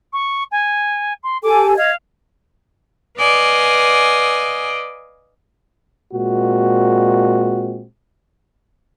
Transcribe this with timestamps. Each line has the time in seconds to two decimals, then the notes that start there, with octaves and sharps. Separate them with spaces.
0.13 C#6
0.51 G#5
1.23 C6
1.43 G4 A4 G#5 D6
1.77 D#5 F5 G#6
3.17 B4 D5 D#5 F5 G#5
6.14 A#2 G#3 C4 F#4